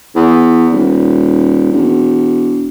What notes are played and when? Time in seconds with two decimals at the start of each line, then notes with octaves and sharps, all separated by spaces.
0.16 E2
0.72 D#1
1.72 E1